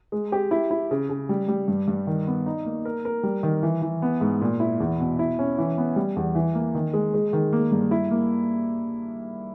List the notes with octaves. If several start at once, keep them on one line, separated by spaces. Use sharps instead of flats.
G#3
G4
E4
E4
C#3
C#3
G3
G3
G2
G2
D#3
B3
D#4
A#3
A#4
A#4
G3
D#3
E3
E3
B3
G#2
A#2
E4
E2
B2
E4
C#4
E3
B3
G3
E2
E3
A#3
D#3
G#3
G#3
D#3
A#3
G2
E4
A#3